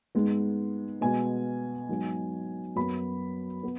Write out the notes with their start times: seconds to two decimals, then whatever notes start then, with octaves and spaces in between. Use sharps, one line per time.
0.15 G#2 G#3 B3
1.01 B2 G#3 B3 G#5
1.89 G#2 F#3 B3
2.76 F#2 F#3 B3 B5
3.63 B3